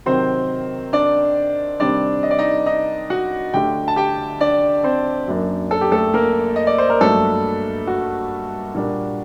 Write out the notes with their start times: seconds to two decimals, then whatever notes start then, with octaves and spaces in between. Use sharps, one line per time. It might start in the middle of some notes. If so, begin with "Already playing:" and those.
0.06 C3 D#3 F#3 C4 C5
0.93 D4 D5
1.80 C3 D#3 G3 C4 D4 D5
2.23 D#5
2.31 D5
2.39 D#4 D#5
2.66 D#4 D#5
3.10 F#4 F#5
3.53 D2 D3 A3 D4 G4 G5
3.88 A5
3.96 G4 G5
4.40 D4 D5
4.84 C4 C5
5.27 F#2 F#3 A#3 D4
5.71 A4
5.81 G4
5.92 A3 A4
6.14 A#3 A#4
6.56 D#5
6.67 D5
6.78 C5
6.90 A#4
7.01 G2 F#3 A3 A#3 D4 A4
7.87 F#4
8.75 A#2 G3 A#3 D4